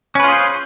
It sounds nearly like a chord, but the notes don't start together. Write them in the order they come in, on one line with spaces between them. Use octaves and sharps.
C#4 B4 F4 G#4 C5